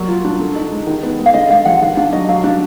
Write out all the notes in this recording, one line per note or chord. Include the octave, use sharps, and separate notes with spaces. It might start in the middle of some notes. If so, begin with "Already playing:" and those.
Already playing: F#3 A#3 D5
F4
D4
D3
D#4
G#3
D#3
B3
G#3
F5
D3 D#5
G#3 F5
F3 F#5
D#3 F5
D4 F5
F#3 D#5
F#3 F5
D4